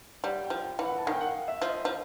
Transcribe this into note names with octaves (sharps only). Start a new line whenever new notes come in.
G3 F#5
G5
F3
G5
E3
F#5
A5
D#3 G#5
G5
F#5
F5
E5
F3
D#5
F3